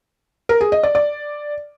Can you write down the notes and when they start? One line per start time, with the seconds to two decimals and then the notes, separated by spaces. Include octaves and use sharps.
0.49 A#4
0.61 G#4
0.72 D#5
0.83 D5
0.95 D5